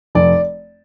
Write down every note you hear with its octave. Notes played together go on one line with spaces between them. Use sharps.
F1 D5